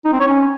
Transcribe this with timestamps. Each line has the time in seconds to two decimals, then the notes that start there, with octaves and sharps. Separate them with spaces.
0.05 D#4
0.13 C4
0.20 C#5
0.28 C#4